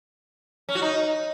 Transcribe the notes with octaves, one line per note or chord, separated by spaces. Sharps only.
C#4
F#4
D#4